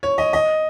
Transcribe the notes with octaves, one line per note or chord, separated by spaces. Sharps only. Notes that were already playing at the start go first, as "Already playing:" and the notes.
C#5
D#5
D#5